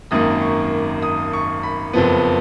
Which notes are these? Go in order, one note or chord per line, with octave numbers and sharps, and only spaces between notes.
G#1 F#2 D#3 A#3 D#6
C#6
D#6
C#6
B5
F#1 F2 F3 B3